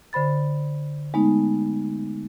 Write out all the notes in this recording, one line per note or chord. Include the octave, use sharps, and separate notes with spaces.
D3 C5 B5 A6
G#3 A3 B3 D#4